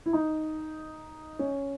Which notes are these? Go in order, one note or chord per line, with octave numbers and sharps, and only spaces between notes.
E4
D#4
C#4